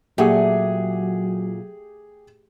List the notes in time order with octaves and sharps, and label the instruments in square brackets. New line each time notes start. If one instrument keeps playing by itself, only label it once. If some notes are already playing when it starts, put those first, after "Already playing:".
[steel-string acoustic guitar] A#2 F#5 [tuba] F#3 [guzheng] A3 [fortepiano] G4 G#4